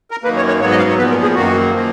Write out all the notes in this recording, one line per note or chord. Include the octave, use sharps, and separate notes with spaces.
A#4
F#2 D#3 A#3 B4
C#5
C#5
G#2 F#3 B3 C#5
D#5
F5
C#5
A#2 F3 B3 B4
A#4
G#4
F#2 D#3 A#3 F#4
F3 A#3